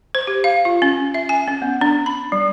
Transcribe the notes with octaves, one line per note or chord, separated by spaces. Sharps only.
C5
G4
F5
F4
C#4
E5
G#5
C#4
B3
D4
B5
G3